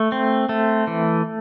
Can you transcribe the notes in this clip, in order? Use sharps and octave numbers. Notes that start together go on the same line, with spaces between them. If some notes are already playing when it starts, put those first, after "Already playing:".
Already playing: A3
C4
A3
E3